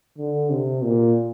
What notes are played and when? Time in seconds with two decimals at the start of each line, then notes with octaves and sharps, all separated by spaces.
0.18 D3
0.50 C3
0.84 A#2